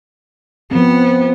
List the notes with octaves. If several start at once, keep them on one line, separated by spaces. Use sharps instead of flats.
F3 B3 C4